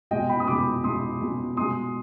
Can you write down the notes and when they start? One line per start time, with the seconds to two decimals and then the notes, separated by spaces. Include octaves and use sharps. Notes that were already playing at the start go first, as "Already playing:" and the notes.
0.11 B2 G#3 D#5 G5
0.29 G5 B5
0.40 D#6
0.47 B2 G#3 B5 D6
0.84 B2 G#3 C6 D#6
1.20 B2 G#3
1.57 B2 G#3 C6 D#6